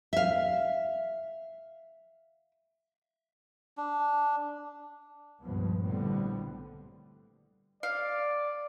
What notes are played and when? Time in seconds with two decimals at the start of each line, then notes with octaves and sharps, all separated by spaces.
0.13 E5 F5
3.77 D4
5.43 C#2 G2 A#2 F3 B3
5.83 A#1 A2 D3 G3 B3 C4
7.83 D5 F5